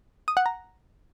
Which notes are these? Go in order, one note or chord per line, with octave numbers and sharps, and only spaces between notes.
D#6
F#5
A#5